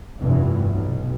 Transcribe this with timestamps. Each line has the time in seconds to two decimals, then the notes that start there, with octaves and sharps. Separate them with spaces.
0.20 F1 E2 G2 E3
0.71 B1 B2